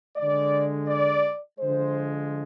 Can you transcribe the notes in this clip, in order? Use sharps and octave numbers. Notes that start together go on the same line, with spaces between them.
D3 G#3 D5
D5
D3 F3 G#3 C5